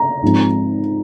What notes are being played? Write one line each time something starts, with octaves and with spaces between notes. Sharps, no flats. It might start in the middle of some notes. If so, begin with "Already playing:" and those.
Already playing: A#5
G#2 F3 G#3 C4